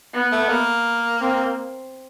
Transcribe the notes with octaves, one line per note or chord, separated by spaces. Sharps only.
B3
A3
A#3
C4